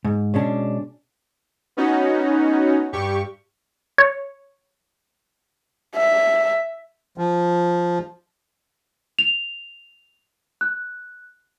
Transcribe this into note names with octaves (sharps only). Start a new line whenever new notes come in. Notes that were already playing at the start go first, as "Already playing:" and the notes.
G#2
B2 G#3 C#4 D4
B3 C#4 D#4 F#4
G2 G4 C#6
C#5
E5
F3
F7
F#6